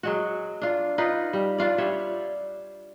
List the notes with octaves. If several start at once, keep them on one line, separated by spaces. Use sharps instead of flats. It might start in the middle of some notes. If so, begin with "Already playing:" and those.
F#3 G#3 F#4
D4 F4
D#4 F4 B4
G3
D4 F4 D5
G3 C#5 E5